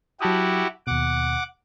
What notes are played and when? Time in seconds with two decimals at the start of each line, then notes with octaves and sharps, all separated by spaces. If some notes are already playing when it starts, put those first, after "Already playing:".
0.21 F#3 E4 F#4 G4 A5 D#6
0.87 D#2 B2 F#5 D6